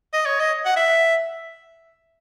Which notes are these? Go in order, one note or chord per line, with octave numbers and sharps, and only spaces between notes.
D#5
C#5
D#5
F#5
E5